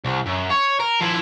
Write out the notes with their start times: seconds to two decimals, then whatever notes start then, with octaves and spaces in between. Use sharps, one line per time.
0.05 C2
0.26 F#2
0.50 C#5
0.80 A#4
1.00 F3 E4